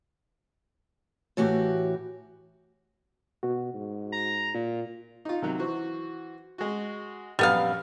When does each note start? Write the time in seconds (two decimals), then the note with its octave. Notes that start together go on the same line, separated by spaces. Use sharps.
1.37 A2 E3 F#4 G4
3.43 B2 F#4
3.74 G#2
4.12 A#5
4.55 A#2
5.25 D#4 F4
5.42 C3 D#3 F#3
5.59 E3 F#4 C5
6.58 G#3 F#4
7.39 A#1 F#2 G3 B3 F5